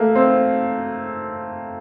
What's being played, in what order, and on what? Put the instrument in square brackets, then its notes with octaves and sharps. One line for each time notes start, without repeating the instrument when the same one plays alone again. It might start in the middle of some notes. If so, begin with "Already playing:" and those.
Already playing: [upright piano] A3 A#3
C4